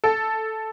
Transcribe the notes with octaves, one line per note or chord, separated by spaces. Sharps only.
A4